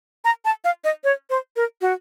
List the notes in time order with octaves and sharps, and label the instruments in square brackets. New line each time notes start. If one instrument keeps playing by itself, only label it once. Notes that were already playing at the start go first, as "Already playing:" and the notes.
[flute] A#5
A5
F5
D#5
C#5
C5
A#4
F#4